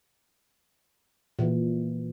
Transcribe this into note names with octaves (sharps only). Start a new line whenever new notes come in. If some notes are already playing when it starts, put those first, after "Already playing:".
A#2 E3